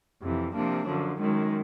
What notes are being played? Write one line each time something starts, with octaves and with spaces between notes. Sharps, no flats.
F2 C3 E3
C3 F3 A#3 D4
F#2 D3 F3
F#2 D#3 G#3